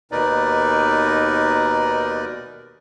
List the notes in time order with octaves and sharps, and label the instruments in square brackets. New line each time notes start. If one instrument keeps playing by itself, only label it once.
[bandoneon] D#2 B2 D#4 A#4 B4 D5